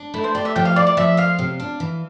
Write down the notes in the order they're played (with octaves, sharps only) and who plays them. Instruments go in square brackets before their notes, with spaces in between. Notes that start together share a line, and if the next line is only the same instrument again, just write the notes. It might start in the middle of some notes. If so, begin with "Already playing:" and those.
Already playing: [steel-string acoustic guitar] D4
[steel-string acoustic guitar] A3 [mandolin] E4
[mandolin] C5
[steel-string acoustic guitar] G4 [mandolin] D5
[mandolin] E5
[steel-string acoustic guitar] F3 [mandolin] G5
[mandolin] F5
[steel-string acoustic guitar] E4 [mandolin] D5
[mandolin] D5
[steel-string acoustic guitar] F3 [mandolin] E5
[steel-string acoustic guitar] F4 [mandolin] F5
[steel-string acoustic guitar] C3
D4
E3